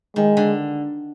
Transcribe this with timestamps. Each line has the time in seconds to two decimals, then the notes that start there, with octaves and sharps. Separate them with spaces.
0.16 D#3 G#3
0.37 D3